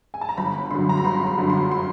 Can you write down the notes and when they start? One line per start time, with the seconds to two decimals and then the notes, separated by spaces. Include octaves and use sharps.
0.14 G#5
0.21 A5
0.29 A#5
0.37 G1 B5
0.71 F#2 D3 C6
0.89 A#5
0.97 B5
1.04 G1 C6
1.26 B5
1.38 F#2 D3
1.50 C6
1.71 C6